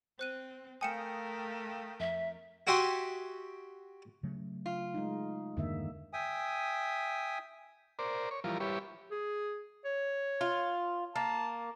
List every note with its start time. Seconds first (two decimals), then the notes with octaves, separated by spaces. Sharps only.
0.19 C4 C5 F#6 D#7
0.81 A3 A#4 F5 G5 G#5 D#6 C#7 E7
2.00 F2 E5
2.67 F#4 G4 E5 G#5 C6 D#6
4.23 C#3 F#3 A3
4.66 F4
4.94 G#3 D#4
5.57 E2 G2 D3 D#3 A#3 E5
6.13 E5 G5 G#5 D#6
7.99 A#4 C5 D5
8.31 C#5
8.44 E3 F3 G3 F4 A#4
8.60 G3 E4 G4 B4 C#5
9.11 G#4
9.85 C#5
10.41 F4
11.16 A#3 A5